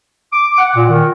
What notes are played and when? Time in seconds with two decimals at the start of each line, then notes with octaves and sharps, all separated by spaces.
0.33 D6
0.59 F#5
0.76 A#2
0.89 D#3